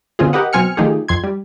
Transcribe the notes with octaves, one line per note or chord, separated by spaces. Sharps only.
B2 D3 C4 C#4 F4 G#4
G4 A#4 B4 D#5 F#5
B2 F#3 C4 G#5 F6 C#7
D#3 F3 A3 D#4 G4 G#4
F2 C6 G#6
G3